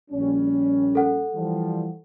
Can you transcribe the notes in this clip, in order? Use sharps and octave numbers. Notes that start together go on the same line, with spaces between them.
A#1 G3 C#4
A4 F#5
E3 F3 G3